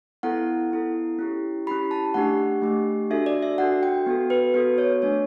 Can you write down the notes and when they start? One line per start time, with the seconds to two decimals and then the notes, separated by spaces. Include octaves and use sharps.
0.23 B3 E4 A4 F#5
0.71 B3 E4 A4
1.19 C#4 E4 G4
1.67 C#4 E4 G4 B5
1.91 A5
2.14 A3 D4 G4 F#5
2.62 A3 D4 G4
3.11 D4 F#4 A4 E5
3.26 D5
3.42 E5
3.58 D4 F#4 A4 F#5
3.83 G5
4.06 B3 F#4 A4
4.30 B4
4.54 B3 F#4 A4 B4
4.78 C#5
5.02 A3 D4 A4 C#5